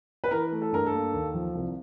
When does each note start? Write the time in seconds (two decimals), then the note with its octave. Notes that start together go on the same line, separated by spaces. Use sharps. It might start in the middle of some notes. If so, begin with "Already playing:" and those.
0.24 B4
0.31 E3 A#4
0.52 A3
0.62 A4
0.72 G2 A#4
0.87 A4
0.93 A#3
1.14 D#2
1.34 F3
1.55 C2